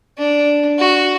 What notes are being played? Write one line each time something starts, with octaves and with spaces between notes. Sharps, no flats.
D4
F#4